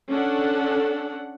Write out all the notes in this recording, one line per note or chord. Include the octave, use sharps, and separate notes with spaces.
C#4 D4 A4 F#5